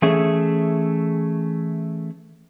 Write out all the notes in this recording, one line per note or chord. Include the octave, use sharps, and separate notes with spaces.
E3 A3 C#4 G#4 E5